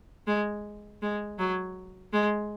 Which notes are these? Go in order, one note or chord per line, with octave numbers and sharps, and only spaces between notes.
G#3
G#3
F#3
G#3